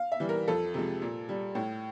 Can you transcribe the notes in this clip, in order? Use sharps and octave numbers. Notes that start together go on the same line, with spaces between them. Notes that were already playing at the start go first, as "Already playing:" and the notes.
Already playing: F5
E5
E3 G3
A#4
F2 A4
C3 F3 G#3
A#2
G3
A2